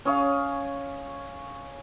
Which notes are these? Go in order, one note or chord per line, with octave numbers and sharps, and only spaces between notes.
C#4 G#4 C#5 F5